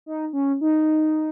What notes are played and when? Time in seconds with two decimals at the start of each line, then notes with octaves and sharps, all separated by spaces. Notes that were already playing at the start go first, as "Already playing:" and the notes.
0.06 D#4
0.33 C#4
0.61 D#4